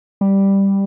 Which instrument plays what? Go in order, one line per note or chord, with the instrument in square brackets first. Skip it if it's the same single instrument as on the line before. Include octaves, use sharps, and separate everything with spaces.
[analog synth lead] G3